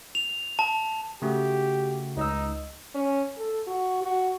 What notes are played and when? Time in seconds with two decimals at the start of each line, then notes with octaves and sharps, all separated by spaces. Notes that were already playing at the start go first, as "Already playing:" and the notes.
0.15 F7
0.59 A5
1.22 C#3 A3 F#4 G4
2.17 C#2 D#4 D#5 E6
2.95 C#4
3.37 A4
3.67 F#4
4.02 F#4